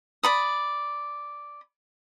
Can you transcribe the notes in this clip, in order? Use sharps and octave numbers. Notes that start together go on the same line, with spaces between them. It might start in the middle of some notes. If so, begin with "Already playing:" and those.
D5 B5 D#6